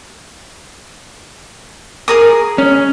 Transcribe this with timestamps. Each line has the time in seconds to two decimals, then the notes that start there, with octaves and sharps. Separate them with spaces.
2.08 G#4 A#4 D#6
2.58 C#4